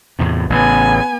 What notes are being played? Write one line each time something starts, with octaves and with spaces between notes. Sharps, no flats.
E2 A2 C3
A1 C#3 B3 G#5